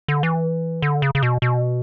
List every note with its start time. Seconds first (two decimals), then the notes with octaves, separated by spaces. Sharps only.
0.08 D3
0.23 E3
0.82 D3
1.02 C#3
1.15 C#3
1.23 B2
1.42 B2